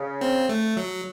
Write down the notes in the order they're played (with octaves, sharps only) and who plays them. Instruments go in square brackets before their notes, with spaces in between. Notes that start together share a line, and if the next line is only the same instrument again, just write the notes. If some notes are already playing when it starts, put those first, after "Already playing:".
Already playing: [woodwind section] C#3
[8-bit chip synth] C4
A3
F#3